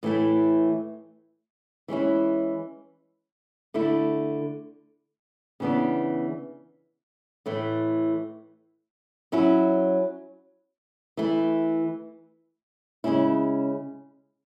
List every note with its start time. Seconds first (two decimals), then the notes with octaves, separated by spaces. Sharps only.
0.03 A2 E3 A3 E4
1.88 E3 G#3 C#4 E4
3.74 D3 A3 E4
5.60 C#3 E3 B3 D4
7.46 A2 E3 A3
9.32 F#3 C#4 E4
11.17 E3 A3 E4
13.04 C#3 G#3 C#4 E4